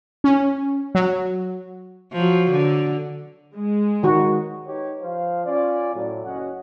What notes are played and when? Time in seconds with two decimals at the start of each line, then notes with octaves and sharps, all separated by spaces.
0.24 C#4
0.95 F#3
2.13 F3 F#3
2.51 D3
3.56 G#3
4.03 D#3 F#4
4.67 D#4 G4 B4 C#5
5.02 F3 C5 F5
5.45 C#4 F4 D5
5.94 A2 F#3
6.24 F#1 C#4 F#4 D#5 F#5